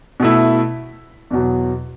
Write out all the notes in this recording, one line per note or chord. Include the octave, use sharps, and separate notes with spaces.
B2 A3 E4
E2 B2 F#3